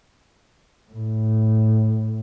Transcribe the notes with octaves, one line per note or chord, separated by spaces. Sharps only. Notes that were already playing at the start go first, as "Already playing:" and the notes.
A2